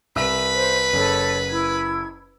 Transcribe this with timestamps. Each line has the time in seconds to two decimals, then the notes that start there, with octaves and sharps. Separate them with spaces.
0.16 C2 B4 E5 B5 E6
0.53 C5
0.93 F#1 A4 C#5
1.50 E4 G#6